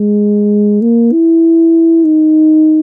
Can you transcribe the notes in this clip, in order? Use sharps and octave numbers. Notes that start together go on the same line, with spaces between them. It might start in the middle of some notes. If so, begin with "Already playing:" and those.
Already playing: G#3
A#3
E4
D#4